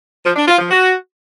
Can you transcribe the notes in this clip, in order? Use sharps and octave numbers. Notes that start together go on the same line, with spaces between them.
F3
D4
F4
F3
F#4